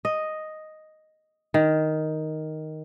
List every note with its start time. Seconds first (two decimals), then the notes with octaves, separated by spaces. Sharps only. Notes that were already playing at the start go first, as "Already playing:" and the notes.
0.05 D#5
1.54 D#3